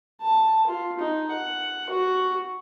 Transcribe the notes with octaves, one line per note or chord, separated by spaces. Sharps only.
A5
F4
D#4
F#5
F#4